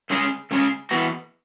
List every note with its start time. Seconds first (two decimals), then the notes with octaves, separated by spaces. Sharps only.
0.10 C#3 G#3 C#4 G#4
0.51 C#3 G#3 C#4 G#4
0.91 E3 B3 F#4